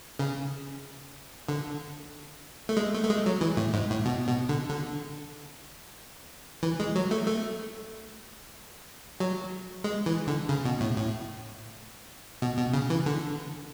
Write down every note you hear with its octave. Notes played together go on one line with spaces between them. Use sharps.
C#3
D3
A3
G#3
A3
A3
G#3
F#3
E3
A2
G#2
A2
B2
B2
D3
D3
E3
G#3
F#3
A3
A3
F#3
G#3
E3
D3
C#3
B2
A2
A2
B2
B2
C#3
E3
D3